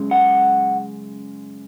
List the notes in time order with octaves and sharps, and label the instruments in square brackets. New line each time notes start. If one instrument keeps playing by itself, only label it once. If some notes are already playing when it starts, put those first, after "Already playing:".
Already playing: [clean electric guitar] F#2 C#3 G#3
F#5